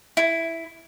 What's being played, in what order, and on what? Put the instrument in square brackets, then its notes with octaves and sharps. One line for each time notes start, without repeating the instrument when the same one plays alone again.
[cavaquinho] E4